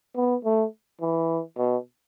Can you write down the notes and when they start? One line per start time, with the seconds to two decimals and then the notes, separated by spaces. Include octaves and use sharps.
0.16 B3
0.45 A3
1.02 E3
1.57 B2